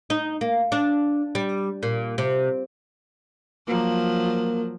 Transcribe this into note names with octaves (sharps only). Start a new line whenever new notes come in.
D#4
A#3
D4
G3
A#2
C3
F3 F#3 A#3